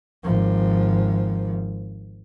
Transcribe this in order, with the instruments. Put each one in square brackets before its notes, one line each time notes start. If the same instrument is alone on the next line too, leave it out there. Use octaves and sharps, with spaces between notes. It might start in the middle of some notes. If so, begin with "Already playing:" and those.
[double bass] G#1 F3